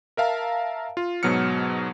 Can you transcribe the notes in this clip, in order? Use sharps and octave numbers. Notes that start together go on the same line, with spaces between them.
A#4 E5 F5 A5 A#5
F4
G#2 B2 F#3 B3 F6 C#7